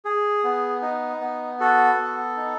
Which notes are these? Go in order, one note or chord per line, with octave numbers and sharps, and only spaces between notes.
G#4
B3
D#4
B3
F#4 A4
B3
D#4